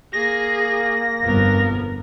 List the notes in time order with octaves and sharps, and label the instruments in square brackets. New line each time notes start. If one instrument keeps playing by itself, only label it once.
[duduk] A#3 [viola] G#4 [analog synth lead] A#6
[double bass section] G1 F2 [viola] B3 A#4